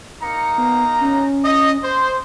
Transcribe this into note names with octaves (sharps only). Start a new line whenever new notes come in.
A#3 D#4 A#5 C#7
B3
C#4
D#5
C5